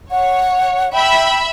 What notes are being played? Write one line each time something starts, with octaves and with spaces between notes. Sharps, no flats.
C#5 F#5
E5 G5 B5